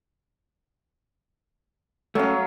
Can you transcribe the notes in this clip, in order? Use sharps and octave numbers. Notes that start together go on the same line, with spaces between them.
F#3 A3 C#4 F5